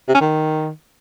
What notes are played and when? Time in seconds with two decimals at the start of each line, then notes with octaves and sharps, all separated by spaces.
0.08 C3
0.15 C#4
0.21 D#3